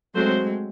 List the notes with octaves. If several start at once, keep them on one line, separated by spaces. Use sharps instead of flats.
F#3 G#3 A3 C4 F#4 C5